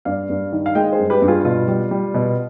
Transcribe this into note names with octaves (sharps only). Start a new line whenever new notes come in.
G2 D5 F5
G2
D#3
F5
G#3 D#5 G5
G#4 C5
G2
G4 B4
G2
F4 G#4
B2 F4
G3
G3
B2